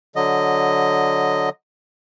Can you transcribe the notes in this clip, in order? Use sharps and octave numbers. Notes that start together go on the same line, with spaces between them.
D3 F#3 D#5